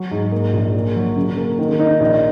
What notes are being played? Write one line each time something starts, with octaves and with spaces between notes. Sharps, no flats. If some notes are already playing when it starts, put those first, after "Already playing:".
Already playing: F#3
G#2
A#3
A#1
A#2
F#3
C#3
A#3
D#3
D#4
A#1